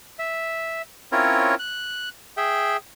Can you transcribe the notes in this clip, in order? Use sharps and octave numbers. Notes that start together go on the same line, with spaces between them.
E5
C4 C#4 E4 F4 A#4 C#5
F#6
G#4 E5 G5